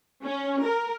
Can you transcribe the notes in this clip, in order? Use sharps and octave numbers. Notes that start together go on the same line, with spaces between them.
C#4
A#4